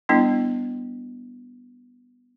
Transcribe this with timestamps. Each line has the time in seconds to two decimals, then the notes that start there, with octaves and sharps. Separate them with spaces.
0.09 G3 B3 D4 E4